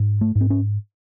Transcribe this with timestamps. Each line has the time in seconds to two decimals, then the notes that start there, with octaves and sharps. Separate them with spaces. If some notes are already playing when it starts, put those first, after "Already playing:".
Already playing: G#2
0.21 A3
0.35 G#2
0.41 C4
0.50 C#4